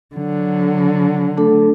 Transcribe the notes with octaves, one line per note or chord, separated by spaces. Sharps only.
D3 F#3
A3 D4 A4